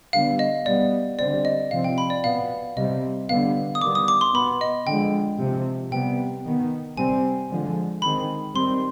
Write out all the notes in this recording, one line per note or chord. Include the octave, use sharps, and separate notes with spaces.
D3 G3 B3 F5
D#5
B2 G3 B3 D5
D3 G3 C4 D5
D#5
C3 F3 C4 F5
G5
B5
D5
B2 B3 F5
C3 G3 C4 D#5
D3 G3 B3 F5
D#6
D#3 G3 B3 D6
D#6
D6
C6
B2 B3 B5
D#5
D3 F3 G#3 G5
C3 F3 C4
C3 G3 B3 G5
D#3 B3
C3 G3 C4 G#5
D3 F3 G#3
D#3 G#3 C4 B5
D#3 G3 C4 C6